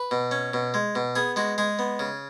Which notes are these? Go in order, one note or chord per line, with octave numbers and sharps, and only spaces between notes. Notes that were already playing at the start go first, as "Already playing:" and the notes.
Already playing: B4
B2
C#4
B2
G#3
B2
B3 G#4
G#3 F#4
G#3 G#4
B3
C#3